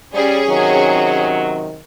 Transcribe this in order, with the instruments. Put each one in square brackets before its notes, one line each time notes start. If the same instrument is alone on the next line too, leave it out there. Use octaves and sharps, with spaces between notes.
[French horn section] G3 [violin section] C#4 G#4
[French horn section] C3 D#3 F#3